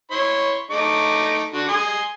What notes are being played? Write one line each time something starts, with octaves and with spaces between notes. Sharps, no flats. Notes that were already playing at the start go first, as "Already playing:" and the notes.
E4 C#5 C6
A3 D#4 D6
D3 F#4
G#5 C6 D#6